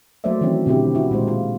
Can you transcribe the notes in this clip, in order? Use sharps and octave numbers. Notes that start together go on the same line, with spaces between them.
F#3 A3 A#3 C5 D5 E5
D#3 E3 F#3 C4 C#4
B2 D3 C4 E4 G4
E4 F#4
A#2 G#3 C5
F4